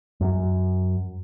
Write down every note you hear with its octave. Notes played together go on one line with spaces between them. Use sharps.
F#2